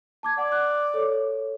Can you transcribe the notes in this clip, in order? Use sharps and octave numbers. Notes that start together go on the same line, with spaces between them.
A5 D6 G#6
D5 F#5
F#6
A4 C#5